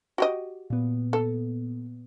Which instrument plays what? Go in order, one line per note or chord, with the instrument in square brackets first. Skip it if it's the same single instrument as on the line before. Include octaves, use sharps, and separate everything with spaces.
[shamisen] F#4 G4 D#5
[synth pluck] A#2 B3
[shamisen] A4